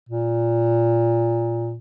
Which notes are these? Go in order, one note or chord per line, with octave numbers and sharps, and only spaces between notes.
A#2